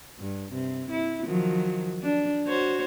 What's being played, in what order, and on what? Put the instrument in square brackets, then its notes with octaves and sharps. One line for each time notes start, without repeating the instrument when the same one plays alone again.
[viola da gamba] G2
C3
E4
D#3 F3 F#3
D4
F#4 C5 C#5